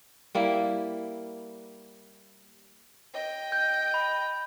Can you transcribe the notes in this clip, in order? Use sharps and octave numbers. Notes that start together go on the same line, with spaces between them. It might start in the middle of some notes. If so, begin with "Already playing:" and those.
G3 A#3 E4
D#5 G5
G6
B5